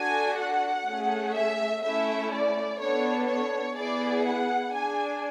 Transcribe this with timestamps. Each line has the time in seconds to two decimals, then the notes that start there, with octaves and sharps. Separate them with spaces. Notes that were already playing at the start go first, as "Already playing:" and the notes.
Already playing: D4 F#4 A4 G#5
0.38 F#5
0.86 A3 C#4 G#4
1.35 E5
1.83 A3 C#4 E4 E5
2.32 D5
2.80 B3 D4 A4 C#5
3.28 C#5
3.76 B3 E4 G#4 D5
4.25 F#5
4.72 D4 G#4 G#5